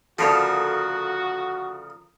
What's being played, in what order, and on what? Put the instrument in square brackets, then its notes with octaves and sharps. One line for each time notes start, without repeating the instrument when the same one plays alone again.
[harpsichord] D2 C#3 F3 [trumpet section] F#4 [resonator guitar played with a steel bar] A4 A#4 C#5